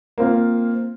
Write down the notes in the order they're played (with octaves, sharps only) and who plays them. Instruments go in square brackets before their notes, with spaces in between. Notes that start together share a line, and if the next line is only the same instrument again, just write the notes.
[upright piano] A#3 C4 F4